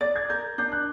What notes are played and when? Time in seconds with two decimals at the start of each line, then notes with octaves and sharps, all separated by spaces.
0.01 D5 A6
0.16 G#6
0.29 A#4 G6
0.58 D4 G6
0.72 F#6